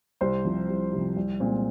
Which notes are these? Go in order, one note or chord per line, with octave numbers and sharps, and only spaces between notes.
C2 C5 C6
C3 F3
C2
C3 F3
C2
A#2 G#3 C4